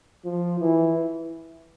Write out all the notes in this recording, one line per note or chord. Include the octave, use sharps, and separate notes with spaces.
F3
E3